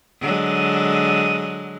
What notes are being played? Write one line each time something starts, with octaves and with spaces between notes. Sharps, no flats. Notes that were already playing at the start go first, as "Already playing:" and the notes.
D3 F#3 G#3